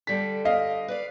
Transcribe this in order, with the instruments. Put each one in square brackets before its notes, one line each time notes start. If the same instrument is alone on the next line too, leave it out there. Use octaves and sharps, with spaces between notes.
[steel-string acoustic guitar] D3 G3 A4 [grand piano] B6
[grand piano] D#5 F5
[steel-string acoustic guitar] B4 D5 F5